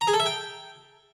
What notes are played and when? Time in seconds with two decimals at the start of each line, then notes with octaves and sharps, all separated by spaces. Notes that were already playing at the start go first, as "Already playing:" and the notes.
0.01 A#5
0.07 G#4
0.13 A4
0.20 E5
0.26 G5